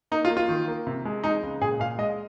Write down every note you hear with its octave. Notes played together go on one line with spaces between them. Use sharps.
A#3 D#4
F4
A#3
F4
D#3
A#3
C3
G#3
G#3 D#4
C#2
A#2 G#4
A#2 F5
G#3 D#5